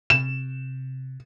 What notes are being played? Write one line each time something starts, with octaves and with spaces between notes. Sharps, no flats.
C3 E7